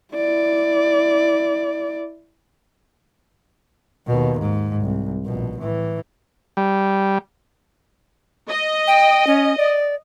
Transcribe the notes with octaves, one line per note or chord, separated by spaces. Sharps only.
E4 D5
D#2 B2
G#2
C2
A#1 B2
A2 E3
G3
D#5
G5
C#4
D5